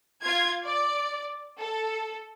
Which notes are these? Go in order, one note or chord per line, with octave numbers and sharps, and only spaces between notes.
F4 G#6
D5
A4